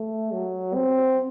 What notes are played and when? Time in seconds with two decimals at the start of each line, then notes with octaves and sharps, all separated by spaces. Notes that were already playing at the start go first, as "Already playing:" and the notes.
Already playing: A3
0.32 F#3
0.74 C4